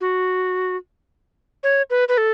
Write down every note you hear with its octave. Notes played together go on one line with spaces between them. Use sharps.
F#4
C#5
B4
B4
A4